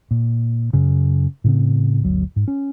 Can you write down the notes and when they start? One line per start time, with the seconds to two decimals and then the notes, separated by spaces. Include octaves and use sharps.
0.11 A#2
0.73 F#2 C#3
1.44 A2 C#3 C4
2.02 G1 D2 F#3
2.36 G#2
2.48 C#4